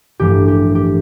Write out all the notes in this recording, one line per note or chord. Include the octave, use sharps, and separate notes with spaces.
A1 G2 F3 A3 G4
G4
G4